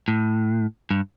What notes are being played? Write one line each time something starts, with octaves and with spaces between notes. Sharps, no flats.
A2
G2